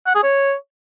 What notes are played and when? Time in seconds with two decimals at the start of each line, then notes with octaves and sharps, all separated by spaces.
0.06 F#5
0.15 G#4
0.23 C#5